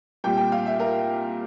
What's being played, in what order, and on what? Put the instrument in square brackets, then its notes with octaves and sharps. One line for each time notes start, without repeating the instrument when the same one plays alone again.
[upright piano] C2 A#2 G3 G5
G5
F5
E5
A#4